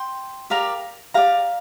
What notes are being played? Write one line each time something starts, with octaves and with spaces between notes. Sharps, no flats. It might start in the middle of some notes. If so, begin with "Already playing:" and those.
Already playing: G5 C6
G4 A#4 D5 F5 A#5
G4 D5 F5 A#5